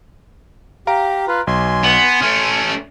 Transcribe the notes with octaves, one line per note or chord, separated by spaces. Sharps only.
G4 F5 A#5 D7
F4 B4
B1 G#5 C6
B3
A3 C#4 F6